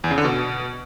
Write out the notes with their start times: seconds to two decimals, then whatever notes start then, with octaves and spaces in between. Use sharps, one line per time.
0.04 E2
0.11 C#3
0.18 D3
0.25 B2